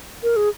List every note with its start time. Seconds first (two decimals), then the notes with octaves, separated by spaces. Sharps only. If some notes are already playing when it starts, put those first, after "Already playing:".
0.23 A#4
0.36 G#4